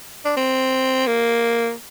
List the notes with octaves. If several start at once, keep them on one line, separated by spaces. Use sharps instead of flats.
D4
C4
A#3